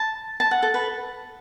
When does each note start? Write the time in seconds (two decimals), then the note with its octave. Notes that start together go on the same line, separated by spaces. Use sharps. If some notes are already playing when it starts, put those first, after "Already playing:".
Already playing: A5
0.40 A5
0.51 F#5
0.63 A4
0.74 B4